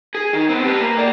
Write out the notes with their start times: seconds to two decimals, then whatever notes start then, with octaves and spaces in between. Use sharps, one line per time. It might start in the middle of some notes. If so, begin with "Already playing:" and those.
0.15 G#4
0.33 D#3
0.49 B3 C4
0.64 G4 B4
0.80 A#3
0.97 G#4 D5